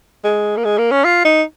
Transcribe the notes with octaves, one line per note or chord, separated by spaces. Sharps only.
G#3
A#3
G#3
A#3
C#4
F4
D#4